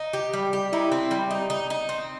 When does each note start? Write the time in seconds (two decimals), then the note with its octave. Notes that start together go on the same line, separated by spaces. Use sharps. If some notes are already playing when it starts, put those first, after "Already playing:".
Already playing: D#4
0.13 G4
0.33 G3
0.53 G4
0.72 D#4 E4
0.92 C4
1.11 G3
1.31 D#4
1.50 D#4
1.70 D#4
1.89 C4